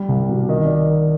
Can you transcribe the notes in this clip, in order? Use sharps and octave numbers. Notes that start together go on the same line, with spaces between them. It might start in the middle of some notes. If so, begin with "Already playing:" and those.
Already playing: G3
C2
B2
D#3 D#5
D5